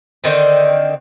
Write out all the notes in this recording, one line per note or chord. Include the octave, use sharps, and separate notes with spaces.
D3 D#3 C4